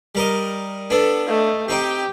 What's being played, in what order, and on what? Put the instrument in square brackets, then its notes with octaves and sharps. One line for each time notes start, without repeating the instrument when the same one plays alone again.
[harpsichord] G3 A#4 D#5
[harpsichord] B3 D4 [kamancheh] A4
[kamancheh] A3 D#5
[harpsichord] C4 D#4 G5 [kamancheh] G4